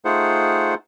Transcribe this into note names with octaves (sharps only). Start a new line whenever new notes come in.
A3 D#4 F4 G#4 C5 F#5